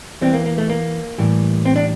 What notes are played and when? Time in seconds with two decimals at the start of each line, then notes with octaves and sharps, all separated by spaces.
0.21 E2 E3 G3 C4
0.34 A#3
0.46 A#3
0.58 A3
0.70 A#3
1.18 A2 E3 G3
1.65 C4
1.76 D4